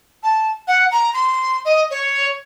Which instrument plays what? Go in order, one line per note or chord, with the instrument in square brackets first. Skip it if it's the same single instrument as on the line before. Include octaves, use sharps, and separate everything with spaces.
[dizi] A5
F#5
A#5
C6
D#5
C#5